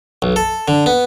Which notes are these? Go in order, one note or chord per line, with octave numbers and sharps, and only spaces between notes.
B1
A4
D3
B3